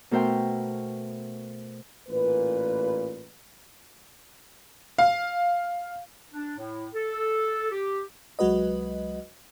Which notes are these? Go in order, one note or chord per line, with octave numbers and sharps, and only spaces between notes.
B2 A3 A#4 C5 E5 G5
A1 A#2 B4
F5
D4
A2
A4
G4
C2 F#3 G#3 F#4 B4 D#5